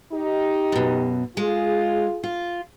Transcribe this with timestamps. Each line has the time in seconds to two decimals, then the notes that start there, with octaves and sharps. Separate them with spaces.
0.12 D#4 G4
0.72 F#2 B2
1.37 G#3 F4 G#4
2.24 F4